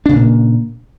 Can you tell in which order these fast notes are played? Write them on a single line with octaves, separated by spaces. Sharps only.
D4 C#3 A#2 A#3